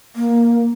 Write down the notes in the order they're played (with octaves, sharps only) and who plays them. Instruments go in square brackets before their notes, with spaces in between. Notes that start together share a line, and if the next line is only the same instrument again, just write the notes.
[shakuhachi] A#3